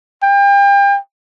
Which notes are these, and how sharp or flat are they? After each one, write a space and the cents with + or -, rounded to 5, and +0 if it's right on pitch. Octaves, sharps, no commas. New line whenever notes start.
G5 +35